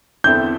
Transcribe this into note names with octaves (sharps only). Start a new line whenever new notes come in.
E2 D3 C4 E4 A4 G6